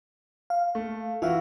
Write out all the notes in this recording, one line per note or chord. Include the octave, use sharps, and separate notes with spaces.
F5
A3
E3 F4 F#4 E5 F5